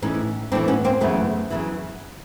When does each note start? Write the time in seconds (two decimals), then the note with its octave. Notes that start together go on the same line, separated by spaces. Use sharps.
0.02 A2 E3 C#4 D#4
0.52 A2 C4 D4
0.55 E3
0.68 B3 C#4
0.85 A#3 C4
1.01 F#2 C#3 E3 A3 B3
1.50 F#2 C#3 E3